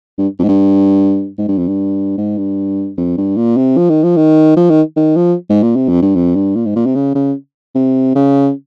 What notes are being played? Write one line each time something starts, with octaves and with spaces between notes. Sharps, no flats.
G2
F2
G#2
G2
G#2
G2
F2
G2
G#2
G2
F2
G2
A#2
C3
F3
D#3
F3
D#3
F3
D#3
D#3
F3
G#2
A#2
C3
F2
G2
F2
G2
A#2
G#2
A#2
C3
C#3
C#3
C3
C#3